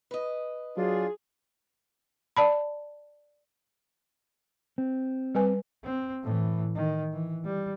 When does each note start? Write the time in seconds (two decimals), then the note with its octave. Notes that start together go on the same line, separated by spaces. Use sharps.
0.11 B4 D#5
0.77 F#3 D4 F4 G#4
2.36 D5 A5 B5
4.78 C4
5.35 G3 B4 G#5
5.83 C4
6.23 A2 E3
6.75 D#3
7.13 E3
7.45 G3